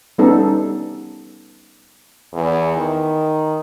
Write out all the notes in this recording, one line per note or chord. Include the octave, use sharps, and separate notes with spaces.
G3 B3 C#4 D#4 A4
E2
D#3